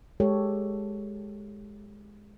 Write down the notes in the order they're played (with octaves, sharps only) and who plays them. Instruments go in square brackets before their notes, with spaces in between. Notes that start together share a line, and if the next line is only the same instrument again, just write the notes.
[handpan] G#3 G4 A4 C#5